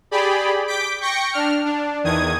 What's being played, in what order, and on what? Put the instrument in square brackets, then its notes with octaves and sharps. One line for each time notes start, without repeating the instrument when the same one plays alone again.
[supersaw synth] G4 G#4 D5 B5
D6 G6 B6 D7
G5 C#6 G6 A#6 C#7
D4 F6
D4
E2 D#3 D#6 G#6